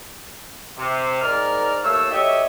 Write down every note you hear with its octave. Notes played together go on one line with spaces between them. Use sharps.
C3
G#2 A#4 D5 F6
D#2 A3 C#5 F5 E6
F#4 G4 A4 C#5 D#5 E5